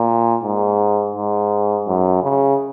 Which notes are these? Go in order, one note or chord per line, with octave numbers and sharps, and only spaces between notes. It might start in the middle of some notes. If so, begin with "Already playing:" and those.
Already playing: A#2
G#2
G#2
F#2
C#3